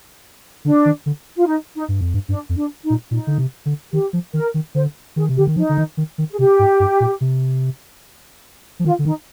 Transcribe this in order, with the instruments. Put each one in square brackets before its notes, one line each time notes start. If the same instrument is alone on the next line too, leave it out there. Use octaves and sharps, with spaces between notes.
[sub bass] D3 [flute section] D4
[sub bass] D#3
D3
[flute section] F4
D#4
D#4
[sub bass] G2
F2
G2
[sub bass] G2 [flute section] D4
[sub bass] F2
[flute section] D4
D#4
[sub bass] A#2
[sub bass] A#2 [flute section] D#4
[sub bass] D3
C3
D3
[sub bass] D#3 [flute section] G4
[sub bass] F3
[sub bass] D#3 [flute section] A#4
[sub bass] D#3
[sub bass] D3 [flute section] C5
[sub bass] D#3 [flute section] G#4
[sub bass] C3
[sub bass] D3 [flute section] G4
[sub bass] D#3
[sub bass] F3 [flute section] D#4
[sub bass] D3
D#3
D#3
D#3
[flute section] G#4
[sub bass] C3 [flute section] G4
[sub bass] G#2
G2
A#2
C3
F3
[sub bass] D#3 [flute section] F4
[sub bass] D3
[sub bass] D#3 [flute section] D#4